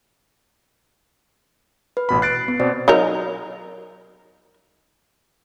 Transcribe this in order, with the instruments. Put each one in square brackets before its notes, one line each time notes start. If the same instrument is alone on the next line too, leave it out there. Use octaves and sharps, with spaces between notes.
[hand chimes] B4
[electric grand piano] A1 B2 B5
[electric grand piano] F#6 A6 D7 [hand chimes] C7
[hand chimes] B3
[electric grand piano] B2 C4 [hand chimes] C5 D5
[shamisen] F#3 D#4 A#4